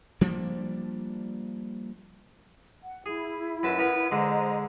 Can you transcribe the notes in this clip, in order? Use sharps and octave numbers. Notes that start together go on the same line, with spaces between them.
F3 G3 A#3 D4
F#5
E4 G#4
F#2 B4 A5
B3 A#4 B4
D3 G#3 C5 D#5 A#5